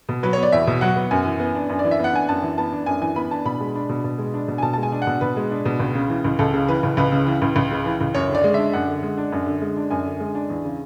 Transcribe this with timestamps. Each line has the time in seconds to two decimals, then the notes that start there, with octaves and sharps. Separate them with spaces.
0.09 B2
0.23 F#3 B4
0.33 B3 C#5
0.43 D5
0.52 E2 E5
0.67 B2
0.81 F#3 F#5
0.96 B3
1.11 F#2 G#5
1.26 E3
1.40 B3
1.55 D4
1.69 F#2
1.79 D5
1.85 E3
1.91 E5
1.99 B3 F#5
2.13 D4 G#5
2.28 F#2 A5
2.43 E3
2.58 B3 A5
2.72 D4
2.86 F#2 G#5
3.01 E3 G#5
3.16 B3 B5
3.31 D4 A5
3.45 B2 B5
3.60 G#3
3.75 D4
3.89 B2
4.04 B2
4.18 G#3
4.34 D4
4.48 B2
4.58 G#5
4.62 B2 A5
4.73 G#3 A5
4.83 G#5
4.92 D4
5.02 F#5
5.07 B2
5.21 B2 B4
5.36 G#3
5.51 D4
5.65 B2
5.80 C#2
5.95 C#3
6.09 E3
6.25 C#2
6.39 C#2 A4
6.53 C#3
6.68 E3 B4
6.83 C#2
6.97 C#2 B4
7.12 C#3
7.27 E3
7.42 C#2
7.56 C#2
7.71 C#3
7.86 E3
8.01 C#2
8.14 F#2 C#5
8.29 D3
8.35 D5
8.44 G#3
8.54 D4 E5
8.73 F#2 F#5
8.88 D3
9.03 G#3
9.17 D4
9.32 F#2
9.46 D3
9.62 G#3
9.77 D4
9.90 F#2 G#5
10.05 D3
10.20 G#3
10.35 D4
10.50 E2
10.64 C#3